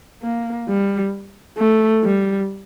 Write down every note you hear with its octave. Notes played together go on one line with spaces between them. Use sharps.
A#3
G3
A3
G3